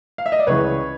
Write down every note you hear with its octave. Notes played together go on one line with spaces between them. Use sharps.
F5
E5
D#5
D5
C#2 C#3 E3 B4 C#5